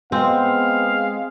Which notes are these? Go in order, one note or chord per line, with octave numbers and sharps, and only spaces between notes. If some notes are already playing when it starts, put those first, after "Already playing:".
G#3 B3 C4 F5